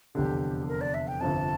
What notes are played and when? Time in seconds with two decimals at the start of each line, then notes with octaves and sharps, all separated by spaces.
0.15 F1 E2 D3 G4
0.68 A#4
0.81 D5
0.94 E5
1.08 G5
1.21 G1 F2 C3 A5